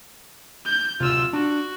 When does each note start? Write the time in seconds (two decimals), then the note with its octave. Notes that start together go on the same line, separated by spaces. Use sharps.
0.65 G6
1.00 D1 D2 C3 F4 E6
1.33 D4 F#4